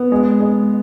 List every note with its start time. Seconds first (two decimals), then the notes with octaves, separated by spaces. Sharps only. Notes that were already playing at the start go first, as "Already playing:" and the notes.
Already playing: B3
0.12 G#3
0.40 G#3